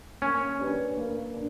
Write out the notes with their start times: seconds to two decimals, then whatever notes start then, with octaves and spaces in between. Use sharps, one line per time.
0.22 A#3 C#4
0.59 D4 G4 B4
0.97 A#3
1.34 D4